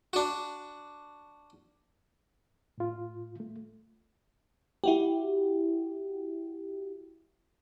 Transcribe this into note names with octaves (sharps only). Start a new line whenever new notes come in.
D4 F#4
A2 F4
A3
E4 F#4 G4